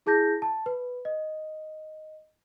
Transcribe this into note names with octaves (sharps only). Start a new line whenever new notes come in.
E4 G#4 A5 G6 A#6
A5
B4
D#5